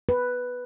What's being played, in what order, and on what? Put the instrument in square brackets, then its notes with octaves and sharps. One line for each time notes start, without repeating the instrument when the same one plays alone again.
[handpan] B4